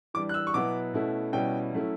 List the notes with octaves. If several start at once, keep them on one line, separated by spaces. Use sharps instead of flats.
E3 G3 D4 D6
F#6
E6
C#6
B2 F#3 B3 E4 D6
B2 A3 C#4 E4
B2 G3 C#4 E4 G5
F#3 A3 C#4 E4